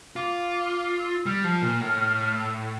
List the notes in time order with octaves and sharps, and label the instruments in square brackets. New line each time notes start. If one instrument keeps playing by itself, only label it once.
[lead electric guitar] F4 [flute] D6
[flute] D6
E6
[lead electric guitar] G3 [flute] F6
[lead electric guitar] F3
A#2
A2
[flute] E6